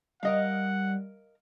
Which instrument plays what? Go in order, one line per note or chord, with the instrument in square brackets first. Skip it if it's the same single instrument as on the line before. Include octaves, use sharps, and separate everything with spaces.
[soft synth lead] G3 [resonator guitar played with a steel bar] A#4 D#5 F5 [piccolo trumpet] F#5